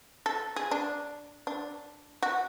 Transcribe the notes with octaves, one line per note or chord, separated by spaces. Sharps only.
A4
G#4
D4
D4
F#4